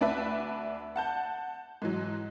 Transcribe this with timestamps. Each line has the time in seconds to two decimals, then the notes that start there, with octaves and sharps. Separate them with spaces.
0.01 D2 D4 B4 E5
0.96 F#5 A5 G6
1.82 G#2 E3 F#3